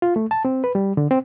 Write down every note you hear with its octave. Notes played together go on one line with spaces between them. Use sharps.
F4
A3
A5
C4
B4
G3
D3
C4